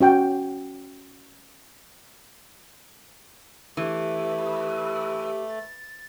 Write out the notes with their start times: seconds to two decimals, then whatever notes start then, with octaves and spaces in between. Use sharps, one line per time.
0.01 C#4 F#4 G5
3.77 E3 A3 G4
5.49 A6